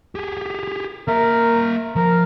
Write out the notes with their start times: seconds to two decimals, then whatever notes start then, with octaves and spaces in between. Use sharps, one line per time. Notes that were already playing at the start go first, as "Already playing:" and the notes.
0.15 G4 G#4
1.08 A#3 A#4 E5
1.96 F3 A#4